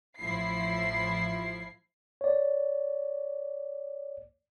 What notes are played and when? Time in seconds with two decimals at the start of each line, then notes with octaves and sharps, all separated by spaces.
0.20 A1 F3 E4 C7
2.21 C#5 D5